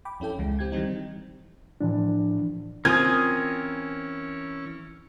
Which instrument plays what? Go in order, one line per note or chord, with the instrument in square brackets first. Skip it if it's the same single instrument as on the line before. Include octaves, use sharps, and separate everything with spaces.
[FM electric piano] G5 B5 D6
F2 C#4 E4 A4 G5
C#2 E3 G#3
C4 G4 G6 G#6
D#3 E3 G3 C4 D#4
[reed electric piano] A2 E3 F3 D4
[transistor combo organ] E3 C#4 [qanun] C4 F4 [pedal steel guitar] A#4 G#5 D#6 [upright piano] G#6